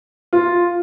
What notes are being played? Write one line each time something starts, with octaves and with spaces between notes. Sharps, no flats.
F4